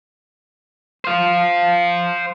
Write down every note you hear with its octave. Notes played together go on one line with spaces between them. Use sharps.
C5 F5